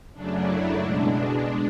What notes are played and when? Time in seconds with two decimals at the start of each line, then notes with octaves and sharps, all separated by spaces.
0.13 F#2 C#3 F#3 A3 D4
0.45 E4
0.76 B2 G#3 D4
1.39 G#3